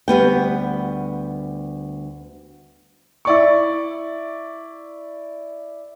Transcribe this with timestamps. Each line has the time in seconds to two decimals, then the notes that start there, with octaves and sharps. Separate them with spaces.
0.08 D2 G3 B3 G5
3.25 E4 D5 C#6